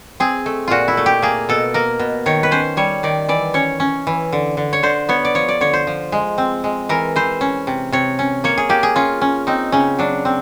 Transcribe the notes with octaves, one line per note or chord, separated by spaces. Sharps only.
C4 G#4
A3
A#2 F4 F#4
E4
A3
G4
A#3 G#4
B2 A4
A#3 A#4
B2
D#3 C#5
B4
C#4 C5
G3 C#5
D#3 D5
E3 D5
C#4 C#5
C#4
E3
D3
D3
C#5
D3 C5
B3 C#5
D5
F3 C#5
D5
D3 C#5
C5
F3
G#3
C4
G#3
E3 A#4
E3 C5
C#4
C3
C3 C#5
C#4
A#3 C#5
G#4
A#3 G4
G#4
C#4 F4
C#4
C4 D#4
C#3 C#4
F#3 D4
C4